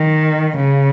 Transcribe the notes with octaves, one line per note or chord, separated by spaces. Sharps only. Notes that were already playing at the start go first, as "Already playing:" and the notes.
Already playing: D#3
C#3